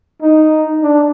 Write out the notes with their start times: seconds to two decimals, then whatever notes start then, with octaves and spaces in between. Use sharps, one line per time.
0.22 D#4
0.82 D4